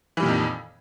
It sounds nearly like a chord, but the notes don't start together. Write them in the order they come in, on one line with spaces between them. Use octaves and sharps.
E3 G3 A#2 D#3 F2